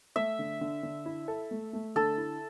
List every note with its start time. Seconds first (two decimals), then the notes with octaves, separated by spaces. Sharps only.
0.16 A3 E5
0.39 D3
0.61 D3
0.83 D3
1.06 E4
1.28 A4
1.51 A3
1.73 A3
1.95 D3 A4
2.18 E4